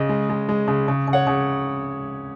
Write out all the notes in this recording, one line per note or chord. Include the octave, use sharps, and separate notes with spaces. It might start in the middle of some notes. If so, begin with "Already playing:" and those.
Already playing: C#3 D#5
G#3
G#3
G#3
C#3
C#3
C#3
C#5 F#5
C#3